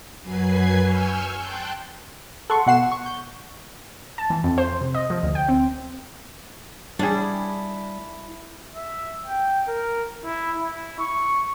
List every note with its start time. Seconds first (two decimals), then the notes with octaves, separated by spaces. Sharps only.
0.23 F#2 F#3 B4 G#5 G#6 C7
0.80 G#5 C#6 E6 F6 G6
1.35 G5 A5 C6 F#6 G6
2.50 A4 F#5 C6 C#6
2.66 B2 F#5 C7 E7
2.92 C#6
3.06 G6
4.18 A5
4.30 E3
4.44 F2
4.58 C5
4.81 C3
4.95 D#5
5.10 F3
5.23 D2
5.35 G5
5.49 C4
6.99 G3 D4 E4 G#4
8.76 E5
9.27 G5
9.68 A#4
10.25 E4
10.59 E4
10.99 C#6